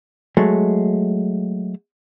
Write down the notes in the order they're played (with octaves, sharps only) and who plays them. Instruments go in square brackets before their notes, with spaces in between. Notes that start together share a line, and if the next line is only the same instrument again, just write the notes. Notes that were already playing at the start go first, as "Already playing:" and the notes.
[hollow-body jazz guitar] F#3 G#3 A3